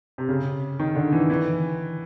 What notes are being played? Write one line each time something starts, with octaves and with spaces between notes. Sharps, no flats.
C3
C#3
D#3
D3
E3
E3